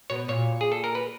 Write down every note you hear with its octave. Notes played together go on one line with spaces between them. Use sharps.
B2 C#5
A#2 C#5
G#4
A4
A#4
B4